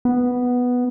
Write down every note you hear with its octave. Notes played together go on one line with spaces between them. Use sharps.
B3